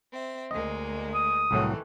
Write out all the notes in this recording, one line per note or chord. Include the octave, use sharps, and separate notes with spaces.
C4 E5
D2 G#3 A#3 D#5
D#6
C2 A2 D#3 E3 F#3 A3